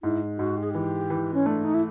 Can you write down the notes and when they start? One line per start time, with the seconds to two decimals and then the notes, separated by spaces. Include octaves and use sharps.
0.03 G#2 E4
0.38 G#2 F#4
0.57 G4
0.63 G#4
0.70 E3 G4
1.10 E3
1.34 C#4
1.46 A3 D4
1.64 D#4
1.74 E4